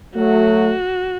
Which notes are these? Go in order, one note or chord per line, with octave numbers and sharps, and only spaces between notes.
F#3 A3 F#4